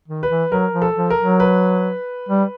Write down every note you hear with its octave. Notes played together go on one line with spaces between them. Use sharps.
D#3
B4
E3
F#3 A#4
F3
A4
F3
A#4
F#3
B4
G3